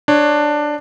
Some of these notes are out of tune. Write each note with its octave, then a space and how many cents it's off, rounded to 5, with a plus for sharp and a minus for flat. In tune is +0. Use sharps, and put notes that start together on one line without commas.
D4 +10 C#5 +0